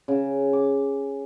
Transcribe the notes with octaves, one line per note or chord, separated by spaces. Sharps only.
C#3
D6